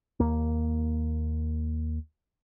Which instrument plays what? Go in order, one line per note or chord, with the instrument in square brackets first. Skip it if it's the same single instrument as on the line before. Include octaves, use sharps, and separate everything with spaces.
[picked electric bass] D#2 A#3